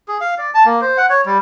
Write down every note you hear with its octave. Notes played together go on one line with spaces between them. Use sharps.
G#4
F5
D5
A5
A#3
C5
F#5
C#5
G3